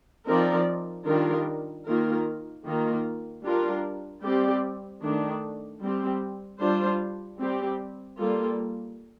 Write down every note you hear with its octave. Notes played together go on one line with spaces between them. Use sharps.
F3 C4 D#4 A#4 D5
D#3 G3 D4 F4 A#4
D#3 A#3 F4 A#4
D#3 A#3 F4 A#4
G3 D4 F4 A#4
G3 C4 G4 D5
D#3 A3 D4
G3 C4 G4
G3 D4 F4 C5
G3 C4 G4
G3 A#3 F4 A4